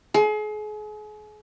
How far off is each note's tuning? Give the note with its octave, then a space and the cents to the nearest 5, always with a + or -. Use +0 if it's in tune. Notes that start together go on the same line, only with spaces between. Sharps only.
G#4 +35